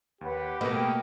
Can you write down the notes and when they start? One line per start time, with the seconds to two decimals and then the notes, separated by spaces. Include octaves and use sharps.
0.21 D#2 G4 B4 C#5 F#5
0.61 B2 A3 A#3 A#4 B4 D#5 G5